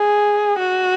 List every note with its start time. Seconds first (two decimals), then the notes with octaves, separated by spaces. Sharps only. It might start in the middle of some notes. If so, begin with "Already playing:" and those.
Already playing: G#4
0.59 F#4